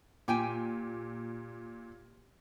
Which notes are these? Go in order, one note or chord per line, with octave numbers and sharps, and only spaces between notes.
A#2 G4 G5 G#5